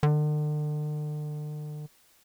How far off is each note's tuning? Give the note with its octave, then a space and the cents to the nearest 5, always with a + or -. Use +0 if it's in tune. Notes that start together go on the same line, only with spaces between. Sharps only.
D3 +40